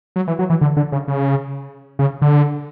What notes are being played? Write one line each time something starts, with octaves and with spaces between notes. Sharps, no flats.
F#3
E3
F#3
E3
D3
D3
C#3
C#3
C#3
D3